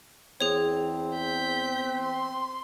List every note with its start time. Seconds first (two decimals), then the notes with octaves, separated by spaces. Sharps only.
0.41 E2 C4 G#4 C#5
1.15 G6 B6
1.98 C6